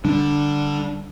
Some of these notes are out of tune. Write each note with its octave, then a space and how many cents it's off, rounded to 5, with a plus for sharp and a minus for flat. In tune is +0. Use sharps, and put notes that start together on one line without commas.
D3 +0 G3 +0 D4 +0